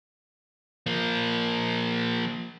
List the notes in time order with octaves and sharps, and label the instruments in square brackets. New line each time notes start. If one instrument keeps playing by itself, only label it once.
[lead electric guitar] F3 A#3